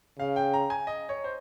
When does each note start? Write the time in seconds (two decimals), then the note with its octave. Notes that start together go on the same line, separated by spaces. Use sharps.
0.19 C#3 F5
0.36 G5
0.53 A#5
0.70 G#5
0.87 D#5
1.09 C#5
1.24 C5